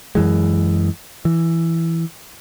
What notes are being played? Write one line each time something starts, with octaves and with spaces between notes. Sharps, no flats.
F#2 E3 G#3
E3